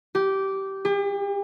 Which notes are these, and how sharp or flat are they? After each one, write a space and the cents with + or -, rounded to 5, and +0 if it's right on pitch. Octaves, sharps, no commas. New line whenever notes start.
G4 -15
G4 +40